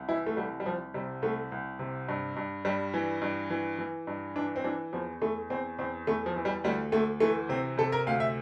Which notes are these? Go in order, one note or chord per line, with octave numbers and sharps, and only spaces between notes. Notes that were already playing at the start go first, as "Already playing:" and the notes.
Already playing: C2
E3 E4
A3
C2 G3
G3
C2 F3
C3 G3
C2 A3
C2
C3
G2
G2
G2 G3
E3
G2
E3
E3
G2
E3 D4
C4
E3 D4
E2 F3
E2 A3
E2 C4
E2 C4
E2 A3
F3
E3
G3
D2 G3
D2 A3
E3 A3
C3 C4
C3 A4
A#4
D2 F5
E5